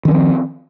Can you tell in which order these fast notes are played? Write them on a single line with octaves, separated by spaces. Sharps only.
D#3 C#4 F3 C4